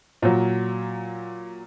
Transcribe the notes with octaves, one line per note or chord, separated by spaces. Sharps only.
A#2 F#3